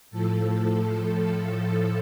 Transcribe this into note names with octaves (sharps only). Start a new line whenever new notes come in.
A2 F3 A4